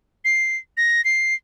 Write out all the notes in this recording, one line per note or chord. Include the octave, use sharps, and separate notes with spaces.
C7
A#6
C7